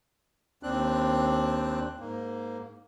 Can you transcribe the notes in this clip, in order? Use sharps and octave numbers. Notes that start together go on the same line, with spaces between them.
D#2 C4 D4 F#6
G#2 A#3